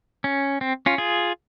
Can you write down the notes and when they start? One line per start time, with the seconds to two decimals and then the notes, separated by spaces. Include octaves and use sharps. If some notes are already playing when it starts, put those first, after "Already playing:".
0.24 C#4
0.61 C4
0.86 C#4 F4
0.98 F4 G#4